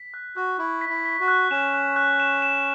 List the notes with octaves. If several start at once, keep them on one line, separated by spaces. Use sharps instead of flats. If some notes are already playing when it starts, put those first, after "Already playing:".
Already playing: B6
F#6
F#4 F#6
E4 C#6
B6
E4
B6
F#4
F#6
C#4 E7
F#6
F#6
E7
E7